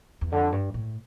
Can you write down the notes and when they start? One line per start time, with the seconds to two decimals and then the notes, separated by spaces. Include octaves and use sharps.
0.21 E2
0.32 F2 D3
0.52 G2
0.74 A2